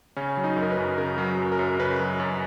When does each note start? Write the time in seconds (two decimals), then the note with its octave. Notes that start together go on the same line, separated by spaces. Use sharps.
0.17 C#3 C#4
0.37 F#3
0.44 D#4
0.56 F#2
0.62 A#4
0.71 B4
0.77 F#2
0.98 C#3 A#4
1.18 F#3
1.38 F#2
1.52 A#4
1.59 F#2
1.79 C#3 B4
1.99 F#3
2.20 F#2